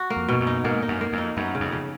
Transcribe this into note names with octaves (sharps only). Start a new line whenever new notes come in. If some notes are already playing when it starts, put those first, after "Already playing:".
Already playing: F#4
A#3
F2
G#2 B2
F#2
D#4
G#2 A#3
D#4
F#2
A#3
F2
D#4
F#2 B3
C#3
F2
C#3